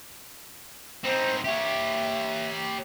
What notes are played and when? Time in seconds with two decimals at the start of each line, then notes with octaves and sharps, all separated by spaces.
1.04 C4 D#4 C5
1.44 G4 C#5 E5